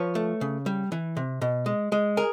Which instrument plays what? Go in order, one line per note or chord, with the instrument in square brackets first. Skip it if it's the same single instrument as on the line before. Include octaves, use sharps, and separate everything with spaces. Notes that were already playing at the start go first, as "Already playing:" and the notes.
Already playing: [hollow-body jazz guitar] F3 B4 C#5
A3
C#3
G3
E3
C3
B2
G#3
G#3
G#4 A#4